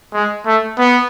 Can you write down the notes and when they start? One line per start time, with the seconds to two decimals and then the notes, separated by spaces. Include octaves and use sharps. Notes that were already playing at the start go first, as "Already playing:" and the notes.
0.14 G#3
0.46 A3
0.78 B3